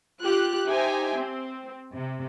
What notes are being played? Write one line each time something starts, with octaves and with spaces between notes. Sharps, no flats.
F4 G4 F#6
D#4 G4 C5 E5 G5 G#5
C4
C3